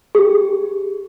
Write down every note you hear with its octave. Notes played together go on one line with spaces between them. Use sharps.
G4 G#4